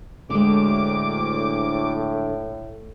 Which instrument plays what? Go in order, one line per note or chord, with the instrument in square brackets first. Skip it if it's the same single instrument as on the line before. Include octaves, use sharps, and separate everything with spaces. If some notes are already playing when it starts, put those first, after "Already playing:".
[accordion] D2 D6 [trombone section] A2 [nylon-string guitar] D3 G#3